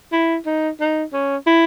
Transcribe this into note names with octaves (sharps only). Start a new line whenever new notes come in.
E4
D#4
D#4
C#4
E4